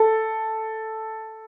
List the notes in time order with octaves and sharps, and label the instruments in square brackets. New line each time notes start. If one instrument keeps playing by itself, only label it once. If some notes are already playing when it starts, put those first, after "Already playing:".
Already playing: [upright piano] A4